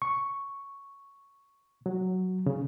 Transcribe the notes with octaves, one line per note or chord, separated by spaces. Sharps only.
C#6
F#3
C#3